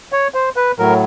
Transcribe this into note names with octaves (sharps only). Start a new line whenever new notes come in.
C#5
C5
B4
A2 F#3 A#4